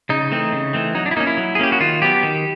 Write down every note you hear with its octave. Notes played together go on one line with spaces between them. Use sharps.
C#3 D#4
E3 A3 C4
C#3
E3 A3 C4
F#3 D#4
D4
E4
A#3 C#4 D#4
E4
F#3
G#4
A#3 C#4 G4
F#4
D#3 F4
F#3 B3 G4
D#3